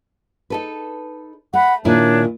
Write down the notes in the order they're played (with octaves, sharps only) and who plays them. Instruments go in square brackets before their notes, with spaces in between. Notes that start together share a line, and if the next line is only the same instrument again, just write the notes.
[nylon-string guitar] D#4 A4 B4
[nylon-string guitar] A3 [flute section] F#5 B5
[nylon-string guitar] A#2 D#3 E4 [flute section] D4 C#5